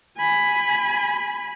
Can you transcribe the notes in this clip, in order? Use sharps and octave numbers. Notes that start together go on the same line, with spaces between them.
G#5 B5